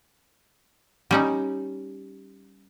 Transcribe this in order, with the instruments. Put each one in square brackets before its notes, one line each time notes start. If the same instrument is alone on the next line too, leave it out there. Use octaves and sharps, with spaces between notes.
[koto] G3 C#4 D#4